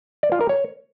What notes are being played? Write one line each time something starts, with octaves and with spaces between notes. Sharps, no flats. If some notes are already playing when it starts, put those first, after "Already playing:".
D5
F4
A#4
C#5